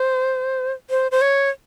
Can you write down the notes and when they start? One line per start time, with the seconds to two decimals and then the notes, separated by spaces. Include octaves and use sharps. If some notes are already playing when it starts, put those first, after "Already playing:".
Already playing: C5
0.90 C5
1.12 C5
1.21 C#5